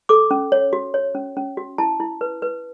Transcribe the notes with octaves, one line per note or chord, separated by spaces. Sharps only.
A4 D6
C#4
C#5
F#4
C#5
C#4
C#4
F#4
E4 A5
E4
B4
B4